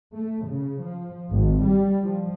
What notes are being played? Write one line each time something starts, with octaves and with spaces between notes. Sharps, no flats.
A3
C#3
F3
G#1
G3
F3